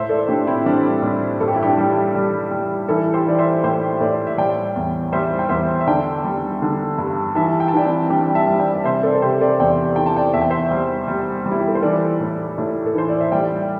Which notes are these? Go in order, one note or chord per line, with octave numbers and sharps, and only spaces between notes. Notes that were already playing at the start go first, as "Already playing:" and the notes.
Already playing: A2 C5 E5
A4 D5
A2 D4 G4
C4 E4
G3 D4 G4
A2
G2 A4
G4
E4
D4 G4
G3
G3
G3
E3 E4 A4
G4 C5
E3 D5
C5 E5
A2 G4 C5
A2 A4 D5
E5
G3 D5 G5
E2
G3 C5 E5
G5
E2 C5 E5
E5
D3 D5 G5
G3
D3
G2
E3 E5 A5
G5
A5
E3 D5 G5
C4 E4
G3 D4 G4
E5 A5
G3
D5 G5
D5
C3 C5 E5
A4 D5
A4
C3 G4 C5
A4 D5
E2 D5 G5
E3 G5
A5
D5 G5
E2 E5
G5
C5 E5
G3
G3
G3
E4
G4
A4
C5
E3 A4 D5
A2
A2
A4
E3 C5
D5
E5
G3 D5 G5